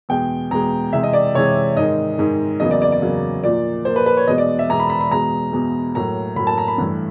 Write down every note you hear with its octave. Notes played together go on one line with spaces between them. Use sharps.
E2 B2 G#3 G5
E2 B2 G#3 A#5
C3 E3 G#3 E5
D#5
D5
C3 E3 G#3 C#5
G#2 D#3 G#3 D#5
G#2 D#3 G#3
E2 C#3 F#3 A#3 D#5
D5
D5
D5
E2 C#3 F#3 A#3
A#2 F3 A#3 D5
A#2 F3 A#3 C5
B4
B4
C#5
E2 B2 G#3 D#5
D5
E5
E2 B2 G#3 A#5
B5
B5
B5
E2 B2 G#3 A#5
E2 B2 G#3
A2 F#3 A#3 A#5
A2 F#3 A#3 B5
A5
A#5
B5
G2 E3 A3